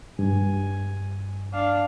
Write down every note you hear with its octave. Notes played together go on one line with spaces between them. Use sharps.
G2 G#5
D4 F5